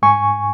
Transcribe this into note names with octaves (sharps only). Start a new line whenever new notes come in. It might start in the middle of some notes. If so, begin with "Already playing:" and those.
G#2 G#5 C#6